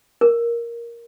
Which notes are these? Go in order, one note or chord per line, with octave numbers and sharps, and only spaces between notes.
A#4